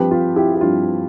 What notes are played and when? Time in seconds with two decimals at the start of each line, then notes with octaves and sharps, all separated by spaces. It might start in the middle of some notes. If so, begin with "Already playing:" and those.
Already playing: G2 F3 C4 G4 B4
0.11 F4
0.36 E4 G4
0.55 G4
0.61 G2 F3 C4 F4